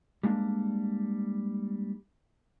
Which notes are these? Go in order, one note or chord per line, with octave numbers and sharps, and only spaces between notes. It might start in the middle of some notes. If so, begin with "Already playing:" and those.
G3 G#3 A#3 D4